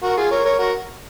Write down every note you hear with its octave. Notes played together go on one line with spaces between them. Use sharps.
F#4 A#4
F4 G#4
A#4 C#5
A#4 C#5
F#4 A#4